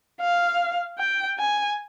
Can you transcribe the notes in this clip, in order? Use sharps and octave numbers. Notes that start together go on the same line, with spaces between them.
F5
G5
G#5